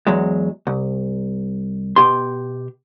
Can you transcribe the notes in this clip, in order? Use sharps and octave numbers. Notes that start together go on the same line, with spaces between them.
E2 F#3 G#3
C2
B2 G4 C6